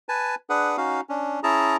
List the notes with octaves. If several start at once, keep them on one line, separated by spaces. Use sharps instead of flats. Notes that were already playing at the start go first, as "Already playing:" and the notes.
B4 G#5 A5
D4 G#4 B4 F#5
C#4 D#4 F#4 F5
C#4 D4
C#4 E4 G#4 A5 A#5